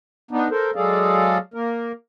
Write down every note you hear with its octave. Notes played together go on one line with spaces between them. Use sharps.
B3 D4 D#4
A4 A#4 C5
F#3 G#3 G#4 A4 D5 F5
A#3 A#4